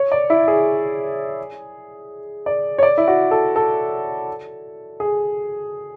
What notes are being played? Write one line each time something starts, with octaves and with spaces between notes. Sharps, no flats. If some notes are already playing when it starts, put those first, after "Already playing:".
Already playing: C#5
D5
E4
G#4
D5
C#5
D5
E4
F#4
A4
A4
G#4